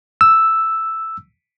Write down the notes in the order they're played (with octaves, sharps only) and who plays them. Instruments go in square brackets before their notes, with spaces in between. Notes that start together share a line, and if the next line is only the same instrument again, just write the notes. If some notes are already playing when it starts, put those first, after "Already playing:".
[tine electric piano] E6